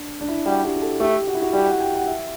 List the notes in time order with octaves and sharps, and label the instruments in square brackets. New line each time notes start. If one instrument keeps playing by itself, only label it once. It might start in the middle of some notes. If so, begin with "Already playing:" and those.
Already playing: [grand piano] D4
D4
E4
[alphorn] G3 [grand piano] F#4
[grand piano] G4
G4
A4
[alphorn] A3 [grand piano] G4
[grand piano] F#4
E4
F#4
[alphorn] G3 [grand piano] G4
[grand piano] F#5
G5
F#5
E5